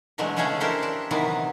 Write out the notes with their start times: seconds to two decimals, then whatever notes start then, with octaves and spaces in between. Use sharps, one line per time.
0.18 B2 D3 E3 F#3 G#3 A3
0.36 C#3 G#3 A3 C#4 G#4 A4
0.60 D4 E4 G4 A4 A#4 C5
0.83 D4
1.11 C3 D#3 E3 F#3 B3